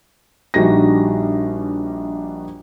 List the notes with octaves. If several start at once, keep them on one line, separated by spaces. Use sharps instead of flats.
A#1 G3 D4 D#4 F#4 A#6